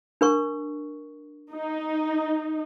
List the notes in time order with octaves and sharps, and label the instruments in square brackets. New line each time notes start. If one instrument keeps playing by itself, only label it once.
[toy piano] D4 A#4 C#6
[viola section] D#4